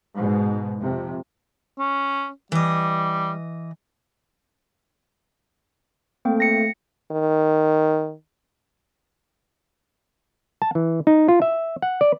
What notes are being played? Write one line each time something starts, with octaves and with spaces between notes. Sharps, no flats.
G#2 B2
F2 C3
C#4
E3 G3 D#5
A3 A#3 C4 G5
A#6 C#7
D#3
A5
E3
D#4
F4
E5
F#5
D5